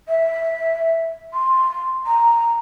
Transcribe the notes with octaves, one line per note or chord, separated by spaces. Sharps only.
E5
C6
A#5